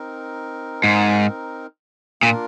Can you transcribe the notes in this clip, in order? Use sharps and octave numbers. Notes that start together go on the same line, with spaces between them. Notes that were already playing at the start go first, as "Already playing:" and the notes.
Already playing: C4 D#4 A#4
G#2
A#2 A#3 D4 F4 A#4